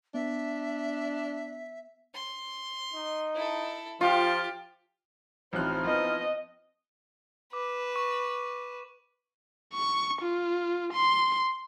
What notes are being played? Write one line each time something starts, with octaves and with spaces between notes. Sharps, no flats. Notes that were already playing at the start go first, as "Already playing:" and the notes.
B3 D4 E5
C6
D#4
E4 A4
F3 F4 G4
A1 F3 C4 D#4 E4 F6 F#6
F3 B3 D#5
B4 D6
C#6
C#6
F4
C6